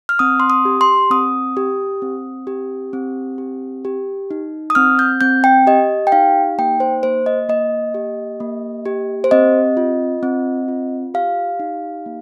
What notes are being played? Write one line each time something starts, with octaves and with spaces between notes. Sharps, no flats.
F6
C4 D#6
C6
D#6
G4
C6
C4 D#6
G4
C4
G4
C4
G4
G4
D#4
D#6
C4 F6
G6
C4 G6
G5
G4 D#5
G5
D#4 F5
A#3 G5
C5
A#3 C5
D#5
A#3 D#5
G4
A#3
G4
C5
C4 D#5
F4
C4
F4
G4 F5
D#4
A#3